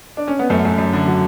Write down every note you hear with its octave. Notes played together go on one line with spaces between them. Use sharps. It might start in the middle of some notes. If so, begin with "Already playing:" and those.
D4
C#4
B3
F#2 A3
F#2
F#2
D3
F#3